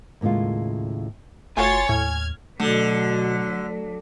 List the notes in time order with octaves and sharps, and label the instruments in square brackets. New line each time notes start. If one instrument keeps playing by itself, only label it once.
[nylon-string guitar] D#2 A2 C#3 G#3 F4
[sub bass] F#1 [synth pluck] A3 F4 F#4 [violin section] C#5 C6 A6 [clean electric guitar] G#5
[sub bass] D#2 [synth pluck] A2 [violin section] F6 G#6
[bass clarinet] B2 [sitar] D3 [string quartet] F#3 [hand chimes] A3